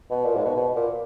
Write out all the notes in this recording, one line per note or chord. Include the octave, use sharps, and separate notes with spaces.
B2
A#2
G#2
B2
B2
A#2